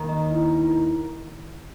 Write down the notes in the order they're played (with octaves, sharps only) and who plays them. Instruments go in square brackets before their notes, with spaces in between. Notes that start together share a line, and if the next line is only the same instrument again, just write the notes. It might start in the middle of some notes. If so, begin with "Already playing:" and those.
Already playing: [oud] D#2 D#3
[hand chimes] D#5
E4
E4